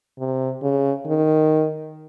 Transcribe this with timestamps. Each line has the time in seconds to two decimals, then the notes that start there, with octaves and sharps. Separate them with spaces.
0.19 C3
0.62 C#3
1.07 D#3